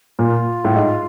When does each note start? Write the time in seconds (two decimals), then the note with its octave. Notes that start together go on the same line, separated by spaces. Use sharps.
0.19 A#2 F4
0.65 A2
0.76 G#2